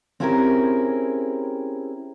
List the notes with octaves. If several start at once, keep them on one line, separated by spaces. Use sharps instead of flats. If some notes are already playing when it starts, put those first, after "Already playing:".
C4 C#4 E4 G4 G#4 A#4